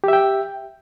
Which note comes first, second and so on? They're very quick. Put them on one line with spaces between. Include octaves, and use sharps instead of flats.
G4 E5 G5